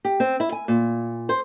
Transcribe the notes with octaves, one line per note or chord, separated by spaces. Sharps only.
G4
C4
E4
G#5
A#2
C5